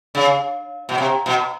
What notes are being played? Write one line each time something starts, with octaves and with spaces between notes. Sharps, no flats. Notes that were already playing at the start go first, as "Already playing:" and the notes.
C#3
B2
C3
B2